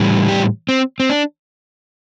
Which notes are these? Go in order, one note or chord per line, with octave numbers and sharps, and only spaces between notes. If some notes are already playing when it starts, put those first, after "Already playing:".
Already playing: A2 E3 G3
G4
C4
C4
D4